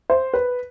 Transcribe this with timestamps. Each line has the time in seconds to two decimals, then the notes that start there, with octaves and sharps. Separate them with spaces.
0.10 C5
0.34 B4